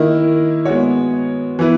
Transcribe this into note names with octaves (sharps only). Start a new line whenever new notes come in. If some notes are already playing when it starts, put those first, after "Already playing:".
Already playing: D#3 A#3 E4 A#4 D#5
G#3 B3 F#4 C#5
E3 B3 E4 B4